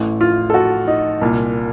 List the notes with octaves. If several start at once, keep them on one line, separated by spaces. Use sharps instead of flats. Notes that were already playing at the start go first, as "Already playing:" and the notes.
Already playing: A1 A2
F4
A4
F#4
D#4
C2 A#2